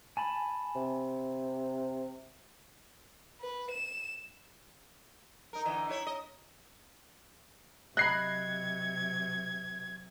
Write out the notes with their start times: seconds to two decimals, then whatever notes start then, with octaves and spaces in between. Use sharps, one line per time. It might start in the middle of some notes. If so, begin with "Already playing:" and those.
0.17 G#5 A5 B5
0.75 C3
3.41 B4
3.71 E7
5.53 D#4 A#4
5.65 D3 E3 D#4
5.87 D#4 E4 C#5
6.07 D#5
7.97 C3 F#3 D#5 B5 F#6 G#6 A#6 C7